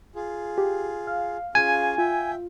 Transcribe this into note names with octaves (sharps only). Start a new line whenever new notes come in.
F4 G#4
G4
F5
C#4 F4 G#4 G#5
F4 E5 G5